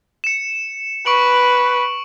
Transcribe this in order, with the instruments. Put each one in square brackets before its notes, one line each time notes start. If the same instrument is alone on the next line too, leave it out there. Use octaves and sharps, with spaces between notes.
[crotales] C#7 E7
[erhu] B4 [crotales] C#6 D7 F#7